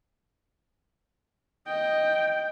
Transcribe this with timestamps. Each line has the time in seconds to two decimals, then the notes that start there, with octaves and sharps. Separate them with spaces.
1.67 D#5 G5